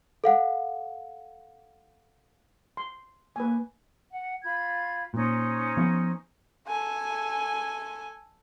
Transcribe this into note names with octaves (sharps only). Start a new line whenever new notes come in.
A4 F5 F#5
C6
A#3 B4 G#5
F#5
F4 B5 G#6
A#2 C#4 D#4 C5
F3 B3
A4 G#5